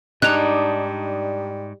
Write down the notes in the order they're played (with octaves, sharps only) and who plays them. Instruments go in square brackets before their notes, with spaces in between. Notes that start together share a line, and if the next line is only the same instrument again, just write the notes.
[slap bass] G#2 [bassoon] G3 [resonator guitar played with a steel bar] D4 D#4 [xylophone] F#6 F7